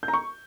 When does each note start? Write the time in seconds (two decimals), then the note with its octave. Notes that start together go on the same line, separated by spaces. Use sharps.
0.03 G6
0.08 A#5
0.14 C#6